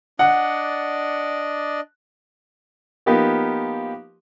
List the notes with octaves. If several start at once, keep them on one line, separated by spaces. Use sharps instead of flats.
D4 D5 D#5 F#5
F3 A#3 B3 D#4 G4